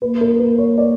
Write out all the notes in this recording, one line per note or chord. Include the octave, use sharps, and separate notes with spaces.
A#3 B4
A#4
B4
C#5
D5